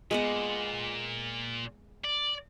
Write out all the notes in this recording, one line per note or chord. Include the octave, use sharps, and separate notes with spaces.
A#2 G#3 B3 F#5
D5